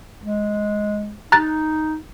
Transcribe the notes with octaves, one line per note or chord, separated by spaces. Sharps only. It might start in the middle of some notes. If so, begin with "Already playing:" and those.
G#3
D#4 A#5 F#6 A6